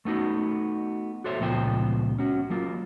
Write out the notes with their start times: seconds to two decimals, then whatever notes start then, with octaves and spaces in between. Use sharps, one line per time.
0.05 A3 B3 D#4 F#4
1.24 F#4 A4 C5 C#5 E5
1.40 C#2 A#2 F3 B3 C5 G5
2.19 C#4 F#4
2.50 F#3 A#3 F4